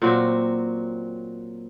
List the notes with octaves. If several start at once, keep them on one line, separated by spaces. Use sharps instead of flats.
A#2 F#3 C4 F#4